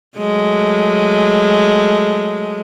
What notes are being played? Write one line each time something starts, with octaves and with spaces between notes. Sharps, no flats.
F#3 G#3 A3